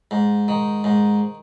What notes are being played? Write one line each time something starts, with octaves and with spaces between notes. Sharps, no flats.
G#2
D#3
G#2